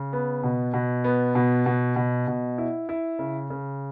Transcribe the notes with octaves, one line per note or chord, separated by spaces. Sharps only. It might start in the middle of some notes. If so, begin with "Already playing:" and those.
Already playing: C#3
B3
B2
B2
B3
B2
B2
B2
B2
E4
E4
C#3
C#3